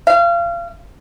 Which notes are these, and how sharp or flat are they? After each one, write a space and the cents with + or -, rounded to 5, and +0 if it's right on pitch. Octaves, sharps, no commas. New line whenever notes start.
F5 -30